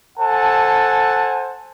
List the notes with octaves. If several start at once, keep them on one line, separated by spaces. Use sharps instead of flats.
A4 C5 F#5 G#5 A5